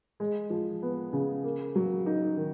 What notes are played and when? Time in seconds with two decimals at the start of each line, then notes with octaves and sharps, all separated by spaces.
0.20 G#3
0.50 F3
0.82 B3
1.13 C#3
1.44 A#3
1.75 F#3
2.06 D#4
2.37 D#3